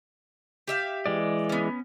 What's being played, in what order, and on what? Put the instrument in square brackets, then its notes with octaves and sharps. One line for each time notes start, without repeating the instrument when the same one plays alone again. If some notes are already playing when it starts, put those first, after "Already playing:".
[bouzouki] G4 E5 F5
[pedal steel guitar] E3 G#3 D5
[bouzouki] B3 C#4